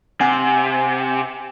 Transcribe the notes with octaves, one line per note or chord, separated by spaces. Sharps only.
C3 F#5 G#5